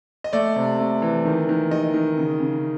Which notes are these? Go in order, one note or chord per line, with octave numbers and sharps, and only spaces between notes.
D#5
A3 D5
C3
A3
E3
D#3
D#3
D#3 D#5
D#3
C#3
C#3